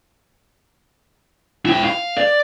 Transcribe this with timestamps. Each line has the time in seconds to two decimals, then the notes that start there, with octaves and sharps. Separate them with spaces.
1.66 E4 G5
1.84 F5
2.17 D5